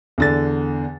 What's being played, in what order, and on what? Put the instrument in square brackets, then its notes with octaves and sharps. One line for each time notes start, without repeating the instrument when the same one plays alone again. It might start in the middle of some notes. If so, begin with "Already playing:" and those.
[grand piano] E2 D3 A6